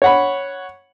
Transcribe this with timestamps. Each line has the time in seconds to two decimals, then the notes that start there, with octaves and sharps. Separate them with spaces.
0.02 C#5 F#5 B5